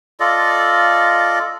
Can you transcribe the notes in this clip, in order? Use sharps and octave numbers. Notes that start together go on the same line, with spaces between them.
F4 A4 D5 D#5